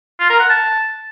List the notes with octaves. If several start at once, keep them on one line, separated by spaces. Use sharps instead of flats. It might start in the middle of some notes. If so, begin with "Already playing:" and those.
F4
A#4
F#5
A5